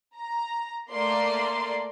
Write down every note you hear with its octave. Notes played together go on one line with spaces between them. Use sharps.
A#5
A3 A#3 D5 C6